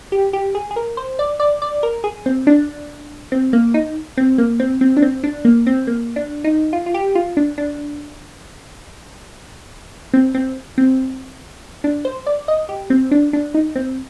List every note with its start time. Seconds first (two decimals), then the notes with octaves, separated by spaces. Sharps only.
0.12 G4
0.33 G4
0.55 G#4
0.71 G#4
0.76 A#4
0.97 C5
1.19 D5
1.40 D5
1.62 D5
1.83 A#4
2.04 G#4
2.26 C4
2.47 D4
3.32 C4
3.53 A#3
3.74 D#4
4.17 C4
4.38 A#3
4.60 C4
4.81 C4
4.97 D4
5.02 C4
5.23 D4
5.45 A#3
5.67 C4
5.87 A#3
6.16 D4
6.44 D#4
6.73 F4
6.86 F4
6.94 G4
7.15 F4
7.37 D4
7.58 D4
10.14 C4
10.35 C4
10.78 C4
11.84 D4
12.05 C5
12.27 D5
12.48 D#5
12.69 G4
12.90 C4
13.11 D4
13.33 D4
13.54 D#4
13.76 C4